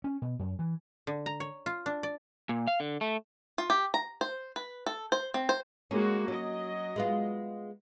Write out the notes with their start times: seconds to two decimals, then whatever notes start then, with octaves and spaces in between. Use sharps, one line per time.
0.04 C#4
0.22 B2
0.39 F#2
0.59 E3
1.07 D3
1.26 A#5
1.40 C#5
1.66 F4
1.86 D4
2.03 D5
2.49 A#2
2.67 F5
2.80 D3
3.01 A3
3.58 F4
3.70 G4
3.94 A#5
4.21 C5
4.56 B4
4.86 A4
5.12 C5
5.34 C4
5.49 C5
5.91 G#3 A#3 C#4 F#4
6.28 F#3 C#4 D#5
6.96 G#3 B3 F4